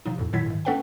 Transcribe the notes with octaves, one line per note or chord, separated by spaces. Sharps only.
C3 F3 D#4
F2 A2 C3
A#2 D#3 F#3 E4 G#6 B6
G#2 D#3
A3 C#4 A4 B4 F#5 G5